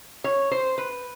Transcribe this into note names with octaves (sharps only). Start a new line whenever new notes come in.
C#5
C5
B4